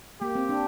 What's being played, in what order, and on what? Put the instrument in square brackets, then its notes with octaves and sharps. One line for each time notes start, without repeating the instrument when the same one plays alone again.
[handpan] A#3 [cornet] G4
[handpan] C4
D4